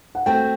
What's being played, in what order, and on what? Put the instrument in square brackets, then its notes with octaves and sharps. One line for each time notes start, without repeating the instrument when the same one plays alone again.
[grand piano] F#5
[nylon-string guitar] A3 C4 F#4 [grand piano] G5